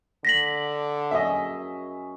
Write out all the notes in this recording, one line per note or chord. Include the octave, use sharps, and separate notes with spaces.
D3 A#6 B6 F#7
F#2 C#4 G#4 D#5 E5